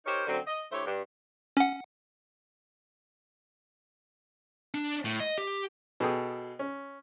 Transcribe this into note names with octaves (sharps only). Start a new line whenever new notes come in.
D#4 G4 A#4 C5 C#5
F#2 D3 F#3 C4
D#5
D3 A3 E4 G4 C5 C#5
G2
C#4 F#5
D4
A2
D#5
G4
B2 G#4 A4 G5 D#6
C#4